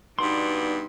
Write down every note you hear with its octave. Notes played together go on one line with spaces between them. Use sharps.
G2 B2 B3 D#4 D5 C6